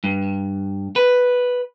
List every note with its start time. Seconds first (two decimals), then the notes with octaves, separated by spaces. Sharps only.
0.04 G2
0.96 B4